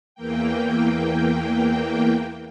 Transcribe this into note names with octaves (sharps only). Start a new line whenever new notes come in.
E2 E3 A#3 G5